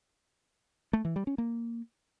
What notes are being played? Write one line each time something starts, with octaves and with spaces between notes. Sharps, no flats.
A3
E3
G3
C#4
A#3